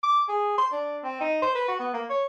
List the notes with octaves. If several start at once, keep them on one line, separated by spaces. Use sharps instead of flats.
D6
G#4
C6
D4
C4
D#4
C5
B4
F#4
B3
A#3
C#5